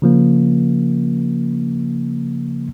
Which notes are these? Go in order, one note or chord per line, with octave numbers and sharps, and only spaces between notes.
C#3 F3 A#3